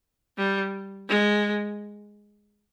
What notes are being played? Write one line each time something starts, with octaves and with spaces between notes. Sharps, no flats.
G3
G#3